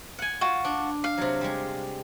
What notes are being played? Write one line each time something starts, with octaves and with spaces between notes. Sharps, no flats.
F#5 G#5
F4 F#4
D4
F5
C3 F#3
G3 G#3